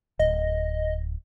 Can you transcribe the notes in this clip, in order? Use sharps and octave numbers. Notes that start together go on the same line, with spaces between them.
D1 D#5